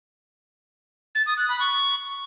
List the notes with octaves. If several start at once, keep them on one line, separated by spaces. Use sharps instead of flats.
A6
D#6
F#6
B5
C#6